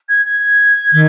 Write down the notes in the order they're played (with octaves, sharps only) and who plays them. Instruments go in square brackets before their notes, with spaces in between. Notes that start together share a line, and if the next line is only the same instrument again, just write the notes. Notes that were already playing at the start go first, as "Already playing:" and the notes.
[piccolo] G#6
G#6
[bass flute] D#3